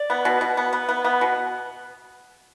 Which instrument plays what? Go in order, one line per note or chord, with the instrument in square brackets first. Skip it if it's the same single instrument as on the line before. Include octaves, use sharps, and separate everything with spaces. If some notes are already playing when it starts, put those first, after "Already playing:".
Already playing: [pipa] D5
B3
B2
B2
B3
B3
B3
B3
B2